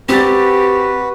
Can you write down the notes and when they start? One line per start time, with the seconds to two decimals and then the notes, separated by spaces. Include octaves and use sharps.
0.09 C4 F#4 G4 B4 A6